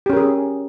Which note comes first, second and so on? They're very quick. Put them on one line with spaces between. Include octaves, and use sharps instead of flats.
G4 C#4 A#4 G#4